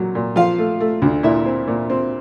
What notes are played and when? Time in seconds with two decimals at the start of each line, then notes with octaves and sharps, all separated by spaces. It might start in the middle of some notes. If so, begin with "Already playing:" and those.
Already playing: A#2 F#3
0.15 A#2
0.36 F3 F4 F5
0.58 A3
0.80 A3
1.02 D2
1.23 A#2 E4 E5
1.46 C4
1.67 A#2
1.90 C4